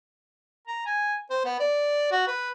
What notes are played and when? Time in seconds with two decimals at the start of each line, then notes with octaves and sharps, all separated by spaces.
0.68 A#5
0.86 G#5
1.30 C5
1.45 B3
1.60 D5
2.11 F#4
2.27 B4